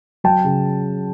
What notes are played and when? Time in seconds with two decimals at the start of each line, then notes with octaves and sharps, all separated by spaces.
0.24 F#3 G5 A5
0.44 C#3